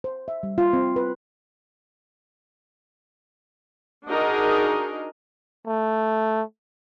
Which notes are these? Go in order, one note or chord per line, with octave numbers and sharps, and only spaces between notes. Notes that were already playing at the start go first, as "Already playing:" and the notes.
C5
E5
G3
F4
C4
B4
D4 D#4 F#4 G#4 A#4 D#5
A3